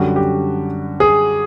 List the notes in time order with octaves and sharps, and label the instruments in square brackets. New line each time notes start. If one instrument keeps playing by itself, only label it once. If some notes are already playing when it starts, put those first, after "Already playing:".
Already playing: [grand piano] F#2 D3 G3 F#4
G4
G#4